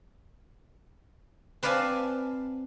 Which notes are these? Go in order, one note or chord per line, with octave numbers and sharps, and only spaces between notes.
C4 B4 D5 F5 G#5 A5